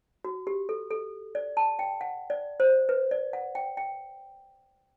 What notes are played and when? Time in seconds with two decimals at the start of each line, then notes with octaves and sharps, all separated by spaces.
0.24 F#4
0.47 G4
0.69 A4
0.91 A4
1.35 D5
1.57 A5
1.79 G5
2.01 F#5
2.30 D5
2.60 C5
2.89 B4
3.11 D5
3.33 F#5
3.55 G5
3.77 G5